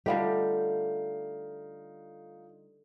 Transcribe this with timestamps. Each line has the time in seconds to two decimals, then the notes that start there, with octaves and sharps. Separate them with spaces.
0.06 D3 G3 A3 D#4 F4 G4 F5